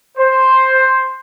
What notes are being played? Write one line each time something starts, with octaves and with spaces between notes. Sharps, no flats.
C5